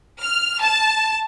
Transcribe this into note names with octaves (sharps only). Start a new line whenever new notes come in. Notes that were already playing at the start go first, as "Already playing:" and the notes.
F6
A5